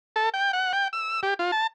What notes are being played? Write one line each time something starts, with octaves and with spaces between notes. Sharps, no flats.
A4
G5
F#5
G5
E6
G4
F4
A5